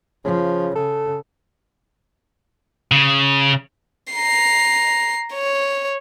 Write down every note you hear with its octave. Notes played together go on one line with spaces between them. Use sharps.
C#3 F3
C#3 A4
C#3
A#5 C7
C#5